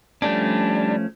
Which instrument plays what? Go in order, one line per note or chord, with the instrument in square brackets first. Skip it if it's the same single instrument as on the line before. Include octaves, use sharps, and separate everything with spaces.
[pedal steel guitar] F3 A3 C#4 [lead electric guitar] G3 D4